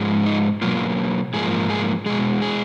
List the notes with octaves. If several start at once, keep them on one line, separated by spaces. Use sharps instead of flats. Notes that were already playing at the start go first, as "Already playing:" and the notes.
Already playing: G#2 F3 G#3
D#4
B2 F#3 A#3 F4
G#2 F3 A#3 G#4
G#4
B2 G#3 G#4
G#4